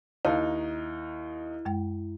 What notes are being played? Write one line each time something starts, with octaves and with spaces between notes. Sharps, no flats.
D#2 D#4 E4 F5 A5
F#2 G#3 G5